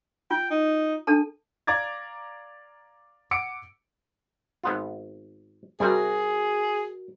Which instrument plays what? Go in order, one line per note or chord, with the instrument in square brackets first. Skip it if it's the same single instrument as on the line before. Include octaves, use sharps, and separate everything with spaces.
[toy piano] F4 [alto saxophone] G5
[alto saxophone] D#4
[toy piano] D4 A4 A5
[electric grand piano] D5 F5 A#5 D6 G#6 A6
F#5 D6 E6 C#7 D7
[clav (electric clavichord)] G#1 B3 F4
[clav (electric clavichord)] C3 G3 [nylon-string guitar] F#4 A#4 D5 [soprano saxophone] G#4